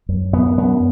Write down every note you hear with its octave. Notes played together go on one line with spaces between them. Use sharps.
F#2
F#2 B3
F#2 B3